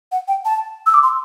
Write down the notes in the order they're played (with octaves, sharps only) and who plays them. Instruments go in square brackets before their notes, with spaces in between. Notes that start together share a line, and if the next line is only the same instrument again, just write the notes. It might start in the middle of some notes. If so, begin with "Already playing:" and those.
[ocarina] F#5
G5
A5
E6
D6
C6